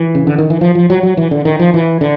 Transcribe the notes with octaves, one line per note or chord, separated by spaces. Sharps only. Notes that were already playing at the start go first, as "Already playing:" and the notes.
Already playing: E3
C#3
D3
D#3
E3
F3
F3
F#3
F#3
E3
D3
D#3
F3
E3
D3